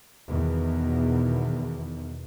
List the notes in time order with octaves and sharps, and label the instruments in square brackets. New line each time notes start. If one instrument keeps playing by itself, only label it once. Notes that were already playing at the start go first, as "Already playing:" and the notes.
[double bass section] E2 B2 D#3